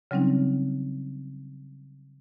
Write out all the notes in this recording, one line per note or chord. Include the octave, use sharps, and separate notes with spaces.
C#3 F#3 G3 C4 C#4 D#4